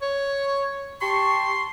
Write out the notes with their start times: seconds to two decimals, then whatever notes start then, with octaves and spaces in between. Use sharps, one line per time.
0.02 C#5
1.02 G4 A5 C6 C#6